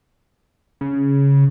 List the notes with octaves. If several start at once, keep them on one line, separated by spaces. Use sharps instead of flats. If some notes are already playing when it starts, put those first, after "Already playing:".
C#3